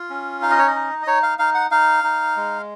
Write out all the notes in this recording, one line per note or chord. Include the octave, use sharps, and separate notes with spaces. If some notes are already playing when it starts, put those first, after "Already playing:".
Already playing: F4
C#4
D#4 F5
D#5
C#5
D#5
D#4
D#5
D#4 C#5
F5
D#4 F5
F#5
D#4 F5
D#4
G#3